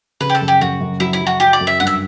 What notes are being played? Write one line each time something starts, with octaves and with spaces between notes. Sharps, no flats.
C#3 B4
G4
A4
F#2
G4
F#2 F#4
F#2
F#3 E4
E4
F#3
F#4
F#3 G4
D5
F#2
E5
G2 F#5
E5